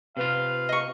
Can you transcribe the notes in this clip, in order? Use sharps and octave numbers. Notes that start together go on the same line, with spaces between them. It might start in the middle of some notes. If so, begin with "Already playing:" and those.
C3 F4 B4 F5
D#5 C#6